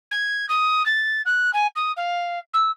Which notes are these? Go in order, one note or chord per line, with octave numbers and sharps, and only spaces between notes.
G#6
D#6
A6
F#6
G#5
D#6
F5
E6